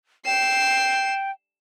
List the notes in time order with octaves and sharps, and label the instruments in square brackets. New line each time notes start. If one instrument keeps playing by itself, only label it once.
[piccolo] G5 [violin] C7 E7